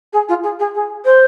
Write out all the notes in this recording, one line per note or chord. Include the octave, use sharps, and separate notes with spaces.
G#4
F4
G#4
G#4
G#4
C5